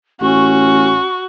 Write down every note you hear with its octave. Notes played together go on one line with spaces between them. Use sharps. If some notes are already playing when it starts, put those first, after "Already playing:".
A1 C#4 F#4 C#6